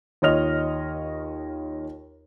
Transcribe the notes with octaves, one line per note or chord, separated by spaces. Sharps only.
D#2 F4 C#5 D#5 F6 F7